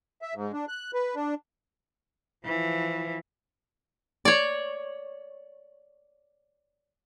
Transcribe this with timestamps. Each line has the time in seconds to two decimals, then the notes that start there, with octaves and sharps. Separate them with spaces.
0.22 E5
0.35 G#2
0.53 D4
0.68 F#6
0.94 B4
1.16 D4
2.45 E3 F3
4.25 C#5 D5